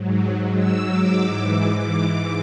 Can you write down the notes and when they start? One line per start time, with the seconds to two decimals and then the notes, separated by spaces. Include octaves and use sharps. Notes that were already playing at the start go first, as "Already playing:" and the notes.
Already playing: G#2 F#3
0.56 E6
0.89 D6
1.22 G#2 E3
1.88 D6